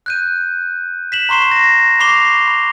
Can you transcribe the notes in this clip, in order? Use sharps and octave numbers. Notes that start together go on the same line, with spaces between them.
F#6 G6 D#7
B6 E7 F#7
A#5 C6 C#6 C7 E7
A#6
B5 C#6 D6 C7 F7 G7
B5